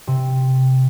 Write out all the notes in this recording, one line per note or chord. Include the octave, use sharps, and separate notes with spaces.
C3